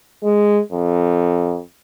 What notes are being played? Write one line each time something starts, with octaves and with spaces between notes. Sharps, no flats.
G#3
F2